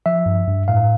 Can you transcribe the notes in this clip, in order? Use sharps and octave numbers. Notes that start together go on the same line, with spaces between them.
F3 E5
G2
G2
A2 F5